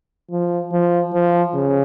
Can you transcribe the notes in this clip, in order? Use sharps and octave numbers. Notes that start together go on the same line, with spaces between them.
F3
F3
F3
C#3